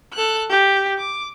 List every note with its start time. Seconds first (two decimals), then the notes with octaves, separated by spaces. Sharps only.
0.14 A4 F#6
0.50 G4
0.98 D6